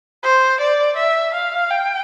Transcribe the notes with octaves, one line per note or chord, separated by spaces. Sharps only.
C5
D5
E5
F5
G5